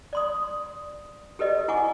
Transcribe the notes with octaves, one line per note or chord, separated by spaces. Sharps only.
D5 C6 D#6
G4 A4 B4 D5 D#5
E4 F#5 G#5 C#6 D6